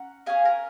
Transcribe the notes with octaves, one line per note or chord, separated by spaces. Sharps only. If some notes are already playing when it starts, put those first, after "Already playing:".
Already playing: C#4 F#5 A#5
C#4 G#4 F5 G#5
A#4